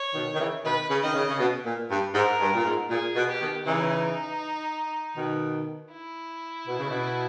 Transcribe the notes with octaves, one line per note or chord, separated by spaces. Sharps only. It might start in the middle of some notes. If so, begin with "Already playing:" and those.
Already playing: C#5
B2 D#3
D#3
C#3 E3
B2 D#3 B4
C#3
D#3 D#5
C#3
C#3
B2
A#2
G2
G#2 A#4
G2
A#2
G#2
A#2 G#4
B2
G4
B2 D#3
C#3 E3 D#4
B2 D#3
E4
B2
C#3
B2